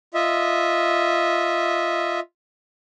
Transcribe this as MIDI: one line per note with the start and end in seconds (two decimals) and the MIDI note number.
0.14 2.20 65
0.14 2.20 75
0.14 2.20 76